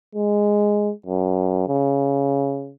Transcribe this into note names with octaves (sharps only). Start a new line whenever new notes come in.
G#3
F#2
C#3